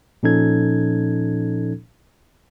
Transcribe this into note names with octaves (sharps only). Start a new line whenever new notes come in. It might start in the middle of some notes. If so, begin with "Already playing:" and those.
A#2 F3 C#4 D#4 A4 G#6